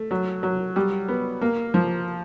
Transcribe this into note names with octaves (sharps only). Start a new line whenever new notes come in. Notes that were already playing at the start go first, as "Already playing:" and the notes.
Already playing: A3
F#3
F#3
G3
B3
A#3
F3